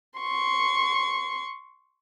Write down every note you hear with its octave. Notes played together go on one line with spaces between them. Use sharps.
C6 C#6